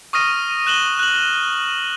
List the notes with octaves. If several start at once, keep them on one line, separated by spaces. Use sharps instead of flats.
C#6 D#6 F6 A#6 D#7
F#6 E7 F#7 G7
F#6 F#7